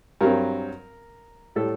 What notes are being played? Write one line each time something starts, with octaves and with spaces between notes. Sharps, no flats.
G2 F#3 C4 A#4
A2 G3 A4